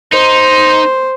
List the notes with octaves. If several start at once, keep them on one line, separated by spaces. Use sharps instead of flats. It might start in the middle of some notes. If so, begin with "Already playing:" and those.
D#4 C5